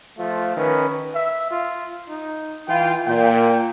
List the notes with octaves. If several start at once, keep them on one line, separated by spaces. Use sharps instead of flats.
F3 A3 F4
D#3 C#4 B4
E5
F4
D#4
E3 F4 G5
A#2 G5